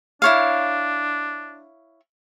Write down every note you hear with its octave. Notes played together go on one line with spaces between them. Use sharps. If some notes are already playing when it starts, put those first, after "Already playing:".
D4 E4 C#5 F5